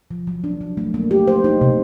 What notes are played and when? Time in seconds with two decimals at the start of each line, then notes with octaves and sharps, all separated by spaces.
0.11 F3
0.27 F#3
0.44 D4
0.61 F#3
0.77 A3
0.94 A#3
1.11 G4
1.28 C5
1.44 D#4
1.61 C3